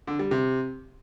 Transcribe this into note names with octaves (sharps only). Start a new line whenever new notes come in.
D3
G3
C3